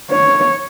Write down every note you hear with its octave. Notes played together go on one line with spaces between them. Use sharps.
C#5